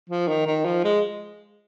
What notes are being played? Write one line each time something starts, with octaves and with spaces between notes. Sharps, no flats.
F3
D#3
D#3
F3
G#3